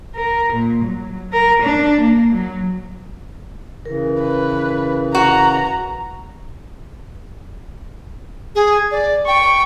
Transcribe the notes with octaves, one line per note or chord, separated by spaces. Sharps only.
A#4
A#2
F#3
A#4
D4
A#3
F#3
C#3 E3 A#4
B4
F#4 A#5
G#4
D5
G5 C#6